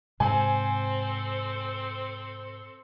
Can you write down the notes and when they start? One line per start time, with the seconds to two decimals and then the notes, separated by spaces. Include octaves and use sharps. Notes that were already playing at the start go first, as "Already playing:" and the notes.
0.20 G#2 C3 G#3 C4 A4 C5 G#5